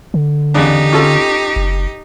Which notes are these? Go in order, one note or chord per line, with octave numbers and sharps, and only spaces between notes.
D3
E2 C#3 D4 D#4 G4
C#4 F4 A4
F#1